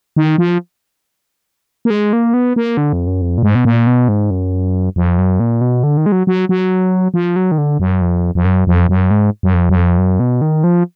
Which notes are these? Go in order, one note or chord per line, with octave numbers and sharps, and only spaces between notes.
D#3
F3
A#3
G#3
A#3
B3
A#3
D3
F2
F#2
F2
A#2
G#2
B2
A#2
B2
G#2
F#2
F2
F#2
A#2
B2
D3
D#3
G#3
F#3
F#3
F#3
F3
F#3
D#3
D3
F#2
F2
F2
F#2
F2
F#2
G#2
F#2
F2
F#2
F2
F#2
B2
D#3
F3